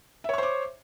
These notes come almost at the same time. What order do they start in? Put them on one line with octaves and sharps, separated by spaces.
E5 C#5 C#6 C5 D6